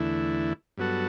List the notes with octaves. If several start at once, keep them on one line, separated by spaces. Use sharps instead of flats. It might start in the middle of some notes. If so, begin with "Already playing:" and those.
Already playing: E2 D3 A3 E4
G2 F#3 B3 F#4 A4